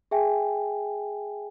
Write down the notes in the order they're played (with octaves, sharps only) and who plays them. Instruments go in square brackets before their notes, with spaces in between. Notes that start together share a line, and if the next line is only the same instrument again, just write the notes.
[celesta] G#4 E5 G5 G#5